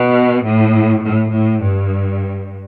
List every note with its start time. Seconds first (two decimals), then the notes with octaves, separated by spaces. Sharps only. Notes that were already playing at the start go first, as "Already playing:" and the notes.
Already playing: B2
0.45 A2
1.04 A2
1.33 A2
1.61 G2